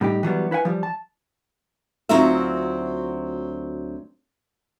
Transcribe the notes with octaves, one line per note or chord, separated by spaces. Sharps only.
A2 G3 D#4 G4
E3 F#3 G3 B3
E4 B4 F5 F#5 G#5
F3 G3
A5
D2 F#3 C4 D#4 F4 E5